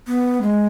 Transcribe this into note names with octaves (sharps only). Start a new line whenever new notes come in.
B3
G#3